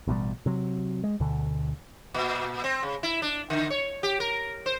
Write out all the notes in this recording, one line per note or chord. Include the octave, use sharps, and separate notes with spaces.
A1 B2 D3 G3
C3 F#3
G#3
D2 B2 D3
A#2
C4
C#3
E4
D4
D3
C#5
G4
A#4
C5